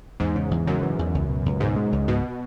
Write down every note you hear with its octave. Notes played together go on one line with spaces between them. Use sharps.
E2 G#2
C#3
E2
F#2 C#3
E3
E2
C#2
B2
C#2
G#2 B2
G#3
C#2
G#2 B2